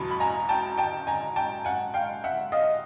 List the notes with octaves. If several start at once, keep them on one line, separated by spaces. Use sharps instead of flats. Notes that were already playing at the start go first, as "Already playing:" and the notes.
Already playing: E2 B2 F#3 A5 B5
B5
G#5 A#5
G5 A5
G5 A5
G#5 A#5
G5 A5
F#5 G#5
F5 G5
E5 F#5
D#5 F5